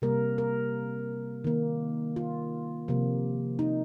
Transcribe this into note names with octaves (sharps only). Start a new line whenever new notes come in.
C3 G3 A#3 A#4
A#4
D#3 A#3
F4
C3 F3 A#3
D#4